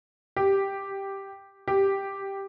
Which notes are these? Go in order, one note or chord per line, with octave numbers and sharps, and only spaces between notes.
G4
G4